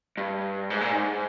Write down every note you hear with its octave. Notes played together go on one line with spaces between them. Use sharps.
G2
G#2
A#2
G#2